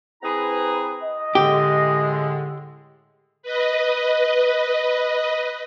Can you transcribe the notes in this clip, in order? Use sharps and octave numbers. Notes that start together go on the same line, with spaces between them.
C4 E4 G#4 B4 A#5
D#5
A2 D3 G#3 G4
B4 D#5